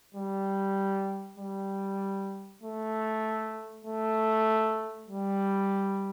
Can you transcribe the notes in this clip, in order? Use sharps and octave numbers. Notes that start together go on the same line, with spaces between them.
G3
G3
A3
A3
G3